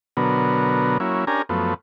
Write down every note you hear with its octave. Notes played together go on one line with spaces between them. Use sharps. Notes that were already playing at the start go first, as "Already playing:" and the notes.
B2 D3 F#3 B3 A#4
F#3 A#3 C#4 E4
C#4 D4 G4 A#4 G#5 A#5
F#2 F3 A3 B3